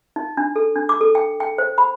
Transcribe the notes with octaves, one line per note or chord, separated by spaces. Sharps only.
D#4
D4
A4
D4
D6
A4
G5
G5
C5
B5